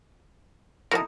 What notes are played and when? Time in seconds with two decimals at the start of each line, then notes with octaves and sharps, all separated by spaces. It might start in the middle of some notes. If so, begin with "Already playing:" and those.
0.91 F3 A3 D#4 E4 F#4 A#4 B4 A5